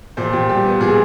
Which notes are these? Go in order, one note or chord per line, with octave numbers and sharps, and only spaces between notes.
A#2 C5
A#2 G4
G3 G4
B3
A#2 G#4